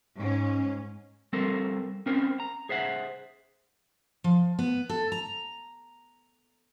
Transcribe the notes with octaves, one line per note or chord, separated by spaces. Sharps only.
G#2 C#4
G3 C4 A4 A#4 C5
C4 C#4 A#4 C5
A#5
G#4 C5 E5 F#5
F3
B3
A4
A#5